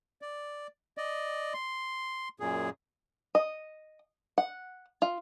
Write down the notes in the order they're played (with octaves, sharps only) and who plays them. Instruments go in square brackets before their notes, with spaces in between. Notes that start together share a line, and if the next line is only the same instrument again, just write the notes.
[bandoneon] D5
D5 D#5
C6
F#2 A#2 G#4
[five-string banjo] D#5
F#5
F4